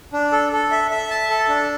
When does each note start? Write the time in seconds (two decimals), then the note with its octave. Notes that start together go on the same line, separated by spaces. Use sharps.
0.13 D4
0.32 A4
0.52 A4
0.71 E5
0.91 E5
1.10 A5
1.29 A4
1.49 D4